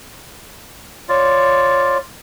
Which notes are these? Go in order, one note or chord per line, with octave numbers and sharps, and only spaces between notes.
F4 C#5 D5